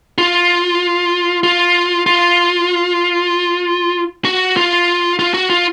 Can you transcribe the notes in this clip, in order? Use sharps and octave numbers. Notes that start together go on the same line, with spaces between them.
F4
F4
F4
F#4
F4
F4
F#4
F4